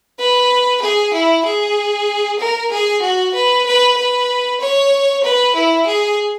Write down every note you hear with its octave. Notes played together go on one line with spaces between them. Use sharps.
B4
G#4
E4
G#4
A#4
G#4
F#4
B4
B4
B4
C#5
B4
E4
G#4